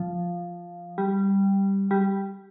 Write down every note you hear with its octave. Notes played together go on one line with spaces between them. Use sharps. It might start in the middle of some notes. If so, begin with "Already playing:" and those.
Already playing: F3
G3
G3